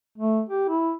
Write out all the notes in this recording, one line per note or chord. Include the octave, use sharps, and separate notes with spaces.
A3
G4
E4